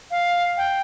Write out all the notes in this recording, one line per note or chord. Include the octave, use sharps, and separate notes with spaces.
F5
G5